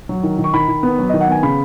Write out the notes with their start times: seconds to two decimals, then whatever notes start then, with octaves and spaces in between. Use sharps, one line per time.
0.09 F#3
0.23 D#3
0.39 D#3
0.44 C#6
0.54 D#3 B5
0.68 D#3
0.83 B3
0.98 F#3
1.09 D#3 D#5
1.21 F#5
1.28 B3 G#5
1.43 C#3 B5